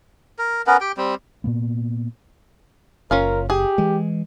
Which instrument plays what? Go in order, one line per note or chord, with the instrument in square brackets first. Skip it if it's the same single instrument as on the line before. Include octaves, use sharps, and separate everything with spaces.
[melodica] A#4
B3 C#4 A#4 B4
G4 G5
G3 C4
[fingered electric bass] A#2 A#3 B3
[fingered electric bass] F#1 [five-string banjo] C#4 F4 F5 [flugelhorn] A#4
[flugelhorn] G4 [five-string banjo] G#4
[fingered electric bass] E3 G#3